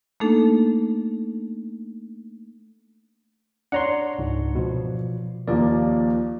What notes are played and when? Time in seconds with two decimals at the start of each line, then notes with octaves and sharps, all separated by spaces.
0.20 A3 A#3 D4 D#4 A4
3.72 D4 C#5 F#5 A#5 C6
4.19 C#2 G#2
4.55 B2 F3
5.48 D#2 F3 A#3 D5